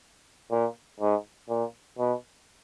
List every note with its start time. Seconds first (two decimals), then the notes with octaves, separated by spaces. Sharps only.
0.51 A#2
1.00 G#2
1.49 A#2
1.98 B2